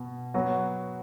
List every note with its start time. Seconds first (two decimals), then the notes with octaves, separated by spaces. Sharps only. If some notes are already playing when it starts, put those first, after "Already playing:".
Already playing: B2
0.34 F#3 B3 F#4